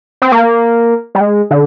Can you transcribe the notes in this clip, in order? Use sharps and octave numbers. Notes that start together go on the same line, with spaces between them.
C4
A#3
G3
G#3
D3